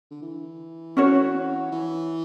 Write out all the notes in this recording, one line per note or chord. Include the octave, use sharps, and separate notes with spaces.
D3
E3
C#4 F#4 C#5
E3